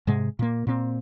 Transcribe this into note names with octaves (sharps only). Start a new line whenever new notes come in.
G#2 C3 G#3
A#2 A#3
A#2 C4